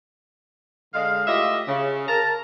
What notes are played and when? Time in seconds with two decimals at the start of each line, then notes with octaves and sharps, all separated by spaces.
0.94 D3 G#3 F5
1.27 A2 F4 G4 D#5 E5
1.68 C#3
2.08 A#4 A5 A#5